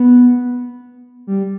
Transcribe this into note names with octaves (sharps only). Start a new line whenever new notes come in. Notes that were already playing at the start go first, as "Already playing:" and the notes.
Already playing: B3
G3